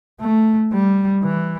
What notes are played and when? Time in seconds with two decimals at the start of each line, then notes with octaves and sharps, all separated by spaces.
0.20 A3
0.73 G3
1.23 E3